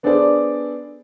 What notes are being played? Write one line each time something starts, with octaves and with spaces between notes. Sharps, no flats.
B3 D4 G#4 A4 C5 D5